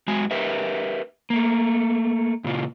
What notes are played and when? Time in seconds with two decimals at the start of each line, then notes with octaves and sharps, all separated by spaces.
0.08 F#2 G#3 F#4 G#5
0.31 G4 A#4 B4 E5
1.30 A3 A#3
2.44 A#2 C#3 F4